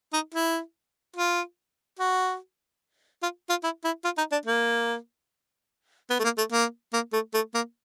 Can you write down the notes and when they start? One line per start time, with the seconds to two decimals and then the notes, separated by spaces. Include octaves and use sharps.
0.13 D#4
0.34 E4
1.16 F4
1.99 F#4
3.23 F4
3.50 F4
3.63 E4
3.84 E4
4.04 F4
4.18 D#4
4.32 D4
4.46 A#3
6.10 B3
6.19 A3
6.24 A#3
6.38 A3
6.52 A#3
6.93 A#3
7.13 A3
7.34 A3
7.54 A#3